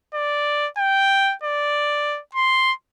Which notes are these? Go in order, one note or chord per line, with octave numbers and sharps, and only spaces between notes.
D5
G5
D5
C6